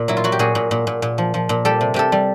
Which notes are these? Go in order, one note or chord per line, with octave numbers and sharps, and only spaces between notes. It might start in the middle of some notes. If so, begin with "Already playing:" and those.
Already playing: A#2
F#3 E4
F4
F#3 F#4
G4
A#2 F#4 G#4
A#2
A#2
A#2
A#2
F3
F3
A#2
G3 G4 A4
C3
C3 G4 A4
G3